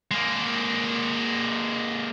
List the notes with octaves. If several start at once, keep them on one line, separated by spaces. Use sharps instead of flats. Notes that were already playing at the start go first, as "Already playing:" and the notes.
G#3 A#3